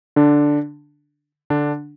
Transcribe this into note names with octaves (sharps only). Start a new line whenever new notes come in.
D3 D4
D3 D4